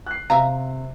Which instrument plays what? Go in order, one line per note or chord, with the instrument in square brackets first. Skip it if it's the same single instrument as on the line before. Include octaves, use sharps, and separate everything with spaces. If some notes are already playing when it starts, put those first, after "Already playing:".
[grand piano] F#6 C7
[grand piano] C3 [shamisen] E5 F5 A#5